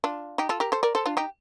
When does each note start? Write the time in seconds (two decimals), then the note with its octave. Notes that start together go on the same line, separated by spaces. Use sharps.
0.04 D4 F4
0.38 D#4 G4
0.49 F4 A4
0.60 G4 A#4
0.72 A4 C5
0.83 A#4 D5
0.95 A4 C5
1.06 D4 F4
1.17 D#4 G4